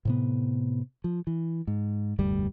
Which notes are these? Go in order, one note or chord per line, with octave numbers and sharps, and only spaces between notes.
A2 C3 B3
F3
E3
G#2
F1 D2 G2 G3